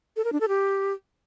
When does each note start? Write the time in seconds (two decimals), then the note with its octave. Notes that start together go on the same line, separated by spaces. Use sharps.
0.16 A4
0.24 A#4
0.32 D4
0.40 A4
0.48 G4